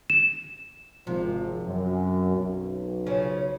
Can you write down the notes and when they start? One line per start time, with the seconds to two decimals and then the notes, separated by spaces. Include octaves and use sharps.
0.10 E7
1.07 G#1 C3 F3
1.64 F#2
2.35 B1
3.06 C#3 F3 C#4